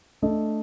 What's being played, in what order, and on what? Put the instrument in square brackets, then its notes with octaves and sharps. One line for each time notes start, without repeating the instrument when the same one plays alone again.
[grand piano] A3 D4 A4 D#5